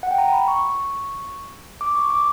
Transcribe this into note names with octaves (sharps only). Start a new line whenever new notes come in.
F#5
G5
A#5
B5
C#6
D6
C#6
D6